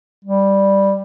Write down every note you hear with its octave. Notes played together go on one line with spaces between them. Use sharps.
G3